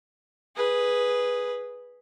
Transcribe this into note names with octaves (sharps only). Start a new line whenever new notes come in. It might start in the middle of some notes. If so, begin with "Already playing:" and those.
G#4 B4